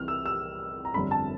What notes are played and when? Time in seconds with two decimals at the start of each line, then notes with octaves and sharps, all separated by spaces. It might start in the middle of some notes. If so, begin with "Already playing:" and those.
Already playing: C2 C3 E3 G3 F6
0.08 E6
0.26 E6
0.85 A#5
0.94 G1 F2 D3 G3 C4 B5
1.11 A5